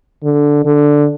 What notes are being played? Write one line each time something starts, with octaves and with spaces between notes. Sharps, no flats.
D3
D3